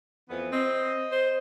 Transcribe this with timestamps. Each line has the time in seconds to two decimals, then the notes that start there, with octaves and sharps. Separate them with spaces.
0.29 F2 E3 B3
0.52 C4 D#5
1.11 C5